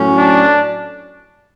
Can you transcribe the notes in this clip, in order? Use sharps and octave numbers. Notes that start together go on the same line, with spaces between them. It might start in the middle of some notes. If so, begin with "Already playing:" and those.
Already playing: A2 F#3 C#4
D4